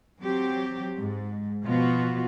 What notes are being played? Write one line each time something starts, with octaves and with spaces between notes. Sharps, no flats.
F#3 C4 G4
G#2
B2 F3 B3 F4 F#4